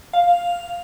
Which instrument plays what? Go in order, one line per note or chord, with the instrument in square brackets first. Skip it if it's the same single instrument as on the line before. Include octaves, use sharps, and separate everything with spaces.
[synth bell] F5